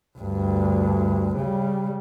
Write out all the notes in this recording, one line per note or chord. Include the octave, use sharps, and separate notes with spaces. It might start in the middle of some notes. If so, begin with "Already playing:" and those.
D2 G2
C#3 G3